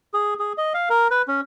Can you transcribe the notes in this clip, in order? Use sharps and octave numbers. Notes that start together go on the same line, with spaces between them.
G#4
G#4
D#5
F5
A#4
B4
C#4